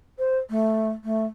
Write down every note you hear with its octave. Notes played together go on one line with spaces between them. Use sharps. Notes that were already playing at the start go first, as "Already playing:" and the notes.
C5
A3
A3